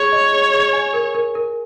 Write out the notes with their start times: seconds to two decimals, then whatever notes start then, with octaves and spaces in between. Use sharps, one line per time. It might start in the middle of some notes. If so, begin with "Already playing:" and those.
Already playing: G#4 C#5
0.12 D#5
0.33 G#4
0.54 G#4
0.73 G#5
0.93 A#4
1.14 A#4
1.35 A#4